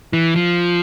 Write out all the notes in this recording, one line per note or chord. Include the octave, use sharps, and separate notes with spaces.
E3
F3